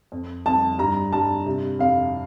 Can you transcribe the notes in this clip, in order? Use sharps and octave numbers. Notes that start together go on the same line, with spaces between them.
F2
F2 A5
G2 A#5
G2 A5
C3
F2 F5